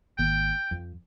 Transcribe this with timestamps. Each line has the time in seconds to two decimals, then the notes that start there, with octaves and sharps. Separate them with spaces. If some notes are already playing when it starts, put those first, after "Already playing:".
0.18 G#1 D#3 A#3 G5
0.71 F2